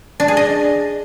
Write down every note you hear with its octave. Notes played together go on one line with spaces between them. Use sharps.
D4
G#4
D#5